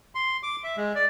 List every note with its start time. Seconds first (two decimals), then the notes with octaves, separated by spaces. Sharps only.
0.15 C6
0.43 D6
0.64 E5
0.77 G#3
0.95 D5